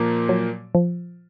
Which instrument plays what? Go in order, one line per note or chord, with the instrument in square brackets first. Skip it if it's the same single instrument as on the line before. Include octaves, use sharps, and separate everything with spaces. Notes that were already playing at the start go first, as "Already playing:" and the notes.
Already playing: [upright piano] A#2 F3 A#3
[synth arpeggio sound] F#3
F3